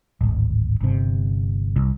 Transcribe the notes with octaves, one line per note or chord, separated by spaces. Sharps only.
D1 G#1
G1 C3
C2